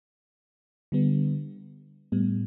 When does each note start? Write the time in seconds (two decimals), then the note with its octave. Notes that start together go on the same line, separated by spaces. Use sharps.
0.92 D3 G3 B3
2.12 A2 G3 B3